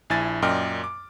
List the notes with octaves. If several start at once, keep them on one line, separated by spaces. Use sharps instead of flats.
A#1 E4 G#5 A6
F#2 A#2 D5 D#5 G5 F6
D6